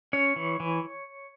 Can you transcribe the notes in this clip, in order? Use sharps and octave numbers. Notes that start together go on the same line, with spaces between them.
C#4 C#5
E3
E3